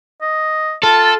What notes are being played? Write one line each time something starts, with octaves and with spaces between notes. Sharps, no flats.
D#5
F4 A4